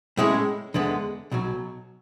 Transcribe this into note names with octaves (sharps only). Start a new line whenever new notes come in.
A2 G#3 C#4 E4
E2 D3 G#3 B3
B1 B2 F#3